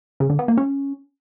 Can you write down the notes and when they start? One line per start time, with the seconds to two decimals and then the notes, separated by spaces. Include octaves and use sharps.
0.20 C#3
0.30 D3
0.39 B3
0.48 A#3
0.57 C#4